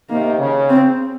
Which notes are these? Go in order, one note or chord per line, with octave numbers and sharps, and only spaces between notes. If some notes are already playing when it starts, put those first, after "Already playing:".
C3 D#3 A#3
C#3
C4